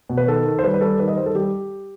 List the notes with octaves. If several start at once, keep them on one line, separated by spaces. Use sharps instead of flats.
B2
B4
D#3 A4
D#3
C5
G3 B4
B4
G3 A4
D#3 B4
D#5
G3 C5
A4
G3 G4